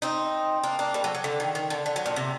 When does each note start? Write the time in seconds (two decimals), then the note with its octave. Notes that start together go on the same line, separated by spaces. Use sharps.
0.02 C4 D#4
0.64 A#3 D4
0.79 A#3 D4
0.94 G3 A#3
1.04 F#3 A3
1.15 F#3
1.24 D3
1.40 D#3
1.55 D#3
1.70 D3
1.86 D3
1.96 F#3
2.06 A#2
2.16 C3